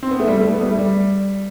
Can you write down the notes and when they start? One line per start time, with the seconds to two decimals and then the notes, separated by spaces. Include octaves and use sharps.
0.03 C4
0.11 B3
0.20 A3
0.27 G3
0.40 A3
0.53 B3
0.61 G3
0.66 A3
0.78 G3